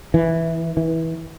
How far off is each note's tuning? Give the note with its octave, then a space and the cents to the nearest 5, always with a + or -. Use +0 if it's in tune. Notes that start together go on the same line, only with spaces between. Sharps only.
E3 -5
E3 -20